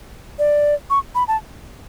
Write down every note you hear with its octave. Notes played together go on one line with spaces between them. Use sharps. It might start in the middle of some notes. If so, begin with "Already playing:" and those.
D5
C#6
B5
A5